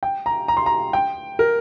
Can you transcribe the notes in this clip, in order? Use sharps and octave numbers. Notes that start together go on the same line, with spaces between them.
G5
A#5
A#5
C6
A#5
G5
A#4